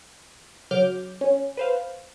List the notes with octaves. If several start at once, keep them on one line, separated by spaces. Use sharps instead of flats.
C#3 F#3 D6 F6 G6
C#4
B4 C5 F5